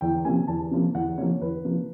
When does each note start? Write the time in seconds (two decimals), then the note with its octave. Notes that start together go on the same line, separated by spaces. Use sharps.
0.01 E2 G5
0.25 C3 F3 A#3 G#5
0.47 E2 A5
0.71 C3 F3 A#3
0.95 E2 F#5
1.17 C3 F3 A#3 C#5
1.41 E2 B4
1.64 C3 F3 A#3